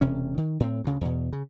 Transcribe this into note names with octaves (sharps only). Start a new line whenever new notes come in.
E1 C3 C#4
D#3
A2 C4
D2 C#3
E2 B2
C#3